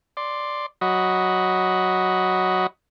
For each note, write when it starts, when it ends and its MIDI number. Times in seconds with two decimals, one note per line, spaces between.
0.17 0.66 74
0.17 0.66 84
0.81 2.67 54
0.81 2.67 66
0.81 2.67 75
0.81 2.67 83